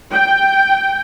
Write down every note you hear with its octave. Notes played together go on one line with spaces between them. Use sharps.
G5